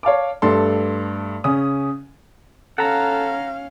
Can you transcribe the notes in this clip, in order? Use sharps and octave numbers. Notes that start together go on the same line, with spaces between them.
C#5 F5 A5 D6
G2 A3 G4 A4 C6
C#3 C#4 D#6
C#4 A4 F5 F#5 A#5